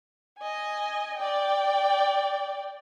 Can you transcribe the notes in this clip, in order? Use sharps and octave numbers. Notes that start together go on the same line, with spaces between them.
D#5 G#5
D5 G5